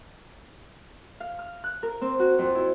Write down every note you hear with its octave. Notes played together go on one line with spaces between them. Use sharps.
F5
F6
F#6
A#4
C4
F#4
F2
E4